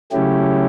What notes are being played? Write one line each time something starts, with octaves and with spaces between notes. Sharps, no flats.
C#3 F#3 A3 C#4 E4 G4